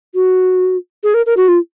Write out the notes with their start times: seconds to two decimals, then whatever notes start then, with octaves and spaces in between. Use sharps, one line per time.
0.15 F#4
1.03 G#4
1.14 A#4
1.26 A#4
1.37 F#4
1.48 F4